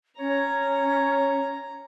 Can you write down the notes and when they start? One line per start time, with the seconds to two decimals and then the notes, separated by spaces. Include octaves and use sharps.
0.19 C#4 C#5 A#5